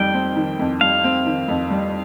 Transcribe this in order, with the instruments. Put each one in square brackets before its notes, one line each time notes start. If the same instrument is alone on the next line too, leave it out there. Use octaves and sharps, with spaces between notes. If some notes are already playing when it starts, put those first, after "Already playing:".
Already playing: [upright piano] F2 D#3 G3 [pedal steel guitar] G5
[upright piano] C4
D#3
F2
[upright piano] G3 [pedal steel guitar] F5
[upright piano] C4
D#3
F2
G3